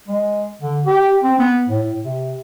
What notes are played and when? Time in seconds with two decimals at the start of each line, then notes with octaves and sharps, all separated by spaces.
0.08 G#3
0.61 D3
0.86 G4
1.23 C4
1.39 B3
1.68 A2
2.03 C3